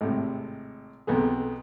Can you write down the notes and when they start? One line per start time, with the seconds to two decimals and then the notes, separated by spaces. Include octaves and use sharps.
0.01 G#1 A2 C3
1.07 B1 F2 B3 G#4